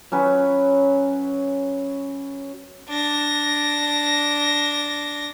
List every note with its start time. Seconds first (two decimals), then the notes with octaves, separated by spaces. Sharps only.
0.12 F#3 C#4 B4
2.88 D4 A#6